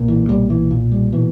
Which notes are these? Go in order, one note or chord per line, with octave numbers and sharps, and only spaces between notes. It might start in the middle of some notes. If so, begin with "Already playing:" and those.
Already playing: B1 A#2
E3
B1 G3
E3
A#2
G3
B2 E3